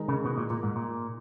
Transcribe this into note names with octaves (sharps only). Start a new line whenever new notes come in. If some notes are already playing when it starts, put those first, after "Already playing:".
Already playing: D#3 G#3 D#4 A#4 D#5
C#3
B2
A#2
A#2
G#2
A#2